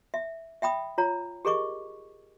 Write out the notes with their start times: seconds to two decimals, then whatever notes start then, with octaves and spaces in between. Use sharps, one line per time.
0.14 E5
0.62 E5 G5 B5 D#6
0.98 F4 C#5 A#5
1.45 G4 G#4 A#4 D#5 C#6 D6